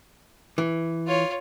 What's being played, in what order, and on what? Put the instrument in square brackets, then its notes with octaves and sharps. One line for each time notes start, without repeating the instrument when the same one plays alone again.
[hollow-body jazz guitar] E3
[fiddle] F4 C#5